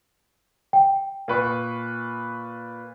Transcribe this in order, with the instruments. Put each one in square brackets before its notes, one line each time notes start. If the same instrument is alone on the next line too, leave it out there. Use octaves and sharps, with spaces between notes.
[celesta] G5
[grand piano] A#2 B4 C#6